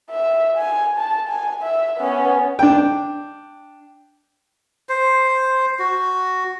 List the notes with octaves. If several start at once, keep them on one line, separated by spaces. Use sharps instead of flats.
E5
G#5
A5
G#5
E5
B3 C#4
D4 G5
C5
F#4